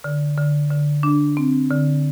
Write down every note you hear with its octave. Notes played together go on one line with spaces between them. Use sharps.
D3
D3
D3
D4
C4
D3